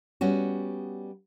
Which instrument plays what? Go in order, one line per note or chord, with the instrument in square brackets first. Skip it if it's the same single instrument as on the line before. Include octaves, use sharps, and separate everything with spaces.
[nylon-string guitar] G3 B3 C#4 F#4